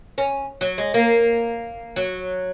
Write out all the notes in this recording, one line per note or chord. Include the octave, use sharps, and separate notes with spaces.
C#4
F#3
G#3
A#3
F#3